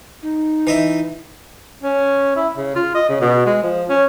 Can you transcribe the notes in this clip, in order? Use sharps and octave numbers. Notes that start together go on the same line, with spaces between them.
D#4
E3 D#5 E5
C#4
E4
C#3
F4
D#5
C#3
B2
G#3
F3
C#4